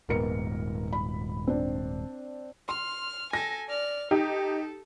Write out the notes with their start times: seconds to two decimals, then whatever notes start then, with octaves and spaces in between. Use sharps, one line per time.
0.09 D#1 G#2 B3 A#4 C#7
0.93 B5
1.47 C4 D4
2.69 C6 F6
3.33 A4 G#5 A#6
3.68 D5 F6
4.11 D#4 G4 A4